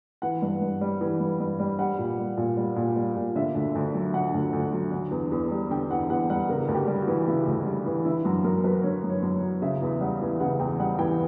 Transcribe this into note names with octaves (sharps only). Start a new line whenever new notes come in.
E3 F#5
G2
G2
G3
E3
G2
G2
G3
G3 F#5
A#2
G3
A#2
G3
A#2
G3
A#2
D3 E5
D2
D2
F#3
D3 F#5
D2
D2
F#3
D3
E2
E2
G3
D3 G5
E2 F#5
E2 F#5
G3 F#5
C#3 A#4
D2
G4
G3
F#4
E3
C#3 E4
D2
G3
E3
D3 E4
F#2 F#4
F#2 A#4
F#3 B4
D3 C#5
F#2
C#5
F#2
F#3
C#3 E5
E2
G3 F#5
E3
C#3 F#5
E2 G5
G3 F#5
E3 G5